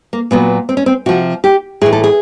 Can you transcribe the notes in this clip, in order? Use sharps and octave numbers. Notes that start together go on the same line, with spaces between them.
A#3
A#2 F#3 B3
C4
C#4
C4
C3 F3 F#4
G4
A2 E3 G#4
A4
G#4